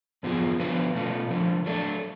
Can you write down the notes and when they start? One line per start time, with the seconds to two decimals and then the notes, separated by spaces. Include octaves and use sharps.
0.23 F#2 F3 B3 F4 G#4
0.59 D3 F3 B3 F#4 B4
0.95 B2 A3 C#4 F4
1.30 F2 D3 F3 A3
1.66 F#3 A3 D4